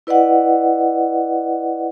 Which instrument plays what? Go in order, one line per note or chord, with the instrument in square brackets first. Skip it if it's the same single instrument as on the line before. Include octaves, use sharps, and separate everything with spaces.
[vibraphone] E4 B4 D5 D#5 F#5